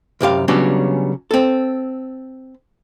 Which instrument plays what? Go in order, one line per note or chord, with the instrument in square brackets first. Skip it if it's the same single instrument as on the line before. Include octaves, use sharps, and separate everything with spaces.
[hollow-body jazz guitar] C2 F#2 G4 F5
C#3 F#3 G3 B3 C#4 D4
C4 A4